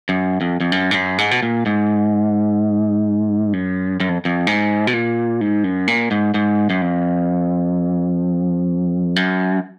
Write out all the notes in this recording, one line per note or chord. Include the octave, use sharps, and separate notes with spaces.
F#2
F2
F2
F#2
G#2
F#2
G#2
B2
A#2
G#2
F#2
F#2
F2
F2
G#2
B2
A#2
G#2
F#2
A#2
G#2
G#2
F#2
F2
F#2